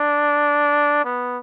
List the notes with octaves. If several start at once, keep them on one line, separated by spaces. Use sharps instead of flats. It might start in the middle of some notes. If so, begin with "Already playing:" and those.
Already playing: D4
B3